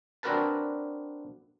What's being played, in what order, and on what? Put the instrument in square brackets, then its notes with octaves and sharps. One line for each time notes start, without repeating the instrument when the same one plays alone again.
[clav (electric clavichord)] C4 D4 F#4 A#4 B4 A5